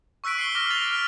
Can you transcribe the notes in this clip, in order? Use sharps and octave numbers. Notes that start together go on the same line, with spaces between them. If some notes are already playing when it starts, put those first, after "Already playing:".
C#6 E6 F#6 B6 D7
C7 D7 G7
D6 F6 A#6 D7 G7
A6 F7 G7
F6